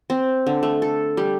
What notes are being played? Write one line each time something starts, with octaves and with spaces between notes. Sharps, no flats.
C4
D3
A3
A4
G3